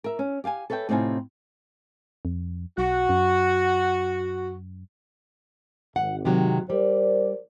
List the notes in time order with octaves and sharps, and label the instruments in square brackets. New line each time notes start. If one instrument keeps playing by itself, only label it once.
[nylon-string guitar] A#4 E5
C#4
G4 F5 G5 G#5
A4 B4 C#5 E5 G5
A2 C3 C4 D#4 F4 G#5
[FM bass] F2
[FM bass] B1 [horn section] F#4
[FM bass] F#2
[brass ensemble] G#1 [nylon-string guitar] F#5
[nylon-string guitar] C3 D#3 F#3
[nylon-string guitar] G3 [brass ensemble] A#4 C5 D5